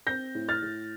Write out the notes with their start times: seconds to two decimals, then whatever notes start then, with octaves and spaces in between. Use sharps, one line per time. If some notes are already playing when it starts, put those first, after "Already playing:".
0.07 C4 G6 A#6
0.35 A2
0.49 F6 A6
0.62 A2